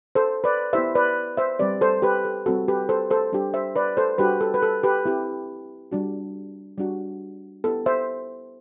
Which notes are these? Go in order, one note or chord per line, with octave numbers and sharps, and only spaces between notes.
A4 C5
B4 D5
B3 E4 G4 C5 E5
B4 D5
C5 E5
G3 C4 G4 B4 D5
A4 C5
G4 B4
A4
G3 C4 F#4 A4
G4 B4
A4 C5
A4 C5
G3 D4 G4
C5 E5
B4 D5
A4 C5
G3 D4 F#4 G4 B4
A4
B4
A4
G4 B4
C4 E4 G4
G3 D4 F#4
G3 D4 F#4
B3 E4 G4 A4
C5 E5